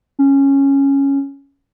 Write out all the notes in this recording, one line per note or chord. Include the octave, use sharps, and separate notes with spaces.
C#4